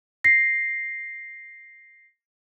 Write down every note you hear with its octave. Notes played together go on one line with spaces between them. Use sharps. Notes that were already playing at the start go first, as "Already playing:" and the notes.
A#6 C7